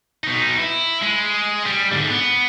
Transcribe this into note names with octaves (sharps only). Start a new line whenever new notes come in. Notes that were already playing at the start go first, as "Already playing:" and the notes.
B2 D#4
E4
G#3
G3
G#2 D3
B3